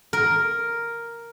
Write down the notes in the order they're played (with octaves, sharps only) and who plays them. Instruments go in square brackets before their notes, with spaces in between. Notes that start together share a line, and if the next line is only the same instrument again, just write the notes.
[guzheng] A#4